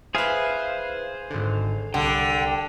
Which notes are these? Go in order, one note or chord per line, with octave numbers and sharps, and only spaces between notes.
E4 G#4 B4 C5 F5
G#1 D3
C2 D3 G5